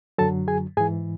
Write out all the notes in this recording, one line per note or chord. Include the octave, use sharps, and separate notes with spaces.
F#2 D3 F#3 A4 A5
G#4 G#5
G#2 E3 G#4 G#5